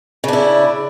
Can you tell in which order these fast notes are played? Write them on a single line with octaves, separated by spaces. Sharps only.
C#3 D4 E4